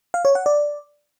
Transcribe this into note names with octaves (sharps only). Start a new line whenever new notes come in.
F5
C#5
F#5
D5